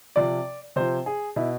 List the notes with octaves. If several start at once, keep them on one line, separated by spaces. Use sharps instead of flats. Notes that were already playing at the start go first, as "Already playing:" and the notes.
C3 F3 D5
C3 F3 C5
G#4
B2 E4